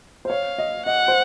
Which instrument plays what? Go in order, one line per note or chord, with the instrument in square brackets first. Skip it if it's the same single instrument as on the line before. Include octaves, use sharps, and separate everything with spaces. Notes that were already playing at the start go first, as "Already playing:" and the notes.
[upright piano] C5
[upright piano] C#5 [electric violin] F5
[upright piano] D#5
[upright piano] D#5 [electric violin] F#5
[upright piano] C5